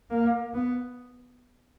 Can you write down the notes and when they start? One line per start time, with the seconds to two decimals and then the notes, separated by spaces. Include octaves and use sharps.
0.10 A#3
0.54 B3